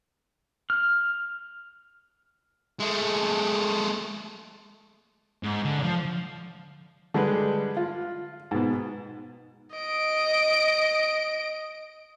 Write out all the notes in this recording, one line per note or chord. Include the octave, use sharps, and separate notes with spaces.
F6
G#3 A3
G#2
D3
F3
D3 G3 G#3 B4
F4
G#2 B2
D#5 D7